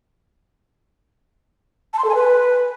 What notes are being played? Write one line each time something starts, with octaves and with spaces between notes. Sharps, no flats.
A5
C6
A4
G#5
B4